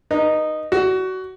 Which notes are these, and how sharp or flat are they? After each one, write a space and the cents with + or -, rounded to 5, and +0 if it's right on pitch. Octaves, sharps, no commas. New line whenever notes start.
D#4 -10 B4 -45
F#4 +20 D5 +0